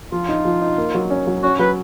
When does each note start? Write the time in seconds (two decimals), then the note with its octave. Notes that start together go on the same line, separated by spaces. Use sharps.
0.12 F3 F4
0.29 D#4
0.45 F3
0.61 D#4
0.78 A#3
0.95 F#3
1.10 C#4
1.27 F#3
1.43 C#4 F#4
1.59 F#3 B4